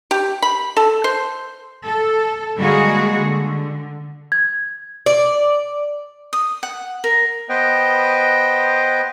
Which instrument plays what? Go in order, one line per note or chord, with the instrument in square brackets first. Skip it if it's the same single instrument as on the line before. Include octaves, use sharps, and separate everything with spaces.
[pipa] G4
B5
A4
C5
[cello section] A4
D3 G3 G#3 A#3 F#4 G#4
D3
[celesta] G#6
[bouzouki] D5
[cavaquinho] D#6
F#5
A#4
[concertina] B3 B4 C5 D#5 G5